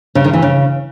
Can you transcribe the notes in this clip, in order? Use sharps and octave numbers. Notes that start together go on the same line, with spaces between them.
C#3
D#3
E3
C#3